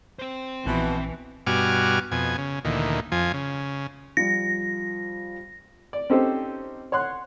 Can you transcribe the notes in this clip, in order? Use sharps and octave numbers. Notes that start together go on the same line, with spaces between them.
C4 C5
A#1 B2 E3
G2 B2 F#4 G#5 D6 F6
F2 B2 G#5
C#3
D2 A#2 D#3 E3
F2 F3 G#5
C#3
F3 G3 A#6
D5
C4 C#4 D#4 G4 A4 C5
C#5 F#5 C6 F#6